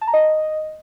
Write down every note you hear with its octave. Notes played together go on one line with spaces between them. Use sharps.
A5
A#5
D#5